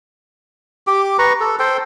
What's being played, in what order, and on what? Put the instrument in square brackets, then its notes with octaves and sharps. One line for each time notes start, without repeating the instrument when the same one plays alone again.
[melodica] G4 D6
B4 A#5 C#6
A4
A4 C5 G5